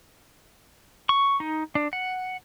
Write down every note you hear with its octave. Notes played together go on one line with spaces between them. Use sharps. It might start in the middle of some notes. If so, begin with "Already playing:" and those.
C#6
D#4
D4
F#5